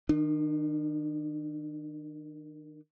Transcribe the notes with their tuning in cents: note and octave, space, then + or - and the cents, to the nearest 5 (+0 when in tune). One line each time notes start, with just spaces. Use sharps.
D#3 +0 D4 +45